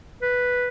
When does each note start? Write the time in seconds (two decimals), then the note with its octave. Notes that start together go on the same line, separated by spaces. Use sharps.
0.22 B4